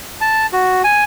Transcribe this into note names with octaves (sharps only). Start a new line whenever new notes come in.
A5
F#4
G#5